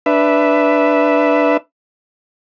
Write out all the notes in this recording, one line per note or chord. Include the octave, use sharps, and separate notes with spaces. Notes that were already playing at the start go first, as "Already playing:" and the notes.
D4 B4 E5